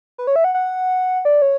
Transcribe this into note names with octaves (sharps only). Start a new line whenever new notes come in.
B4
C#5
E5
F#5
F#5
D5
C#5